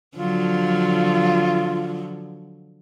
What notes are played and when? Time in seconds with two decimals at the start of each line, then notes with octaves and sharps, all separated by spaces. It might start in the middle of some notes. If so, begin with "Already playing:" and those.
0.17 D3 F3 F#3 F4